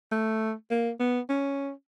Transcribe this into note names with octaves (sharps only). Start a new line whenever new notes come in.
A3
A#3
B3
C#4